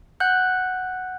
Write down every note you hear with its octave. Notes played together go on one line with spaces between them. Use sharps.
F#5 F#6 G6